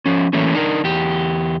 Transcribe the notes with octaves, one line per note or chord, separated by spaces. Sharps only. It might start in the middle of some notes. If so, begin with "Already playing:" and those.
F3 C#4
E3 F#3 A3 A#3 C#4
D4 D#4 A#4
E2 G4